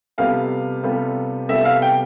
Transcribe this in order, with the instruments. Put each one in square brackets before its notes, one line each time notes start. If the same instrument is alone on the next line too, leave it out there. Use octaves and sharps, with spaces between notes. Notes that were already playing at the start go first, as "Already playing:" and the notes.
[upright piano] C3 G3 B3 F4 A4 [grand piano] F5
[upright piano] C3 G3 B3 F4 A4
[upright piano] C3 G3 B3 F4 A4 [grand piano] E5
[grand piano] F5
G5